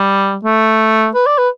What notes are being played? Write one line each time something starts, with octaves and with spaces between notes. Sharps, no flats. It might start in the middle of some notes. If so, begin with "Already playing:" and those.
Already playing: G3
A3
B4
D5
B4